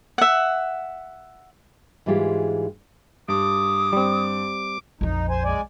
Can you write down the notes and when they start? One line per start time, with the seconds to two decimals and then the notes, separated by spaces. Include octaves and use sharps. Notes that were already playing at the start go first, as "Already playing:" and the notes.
0.18 E5 F#5
2.06 G#2 E3 G3 G#3 F4 G4
3.28 G2 D6 D#6
3.93 G3 C4
5.01 A#1 F2 D#4
5.30 C5 G#5
5.45 G#3 D5 G#5